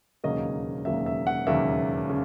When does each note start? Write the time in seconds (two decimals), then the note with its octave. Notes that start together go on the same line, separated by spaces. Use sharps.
0.24 E1 D#2 C#3 F#3 A#3 D#5
0.85 E1 D#2 C#3 F#3 A#3 E5
1.06 E5
1.27 F#5
1.47 E1 D#2 C#3 F#3 A#3 E5
2.10 C#3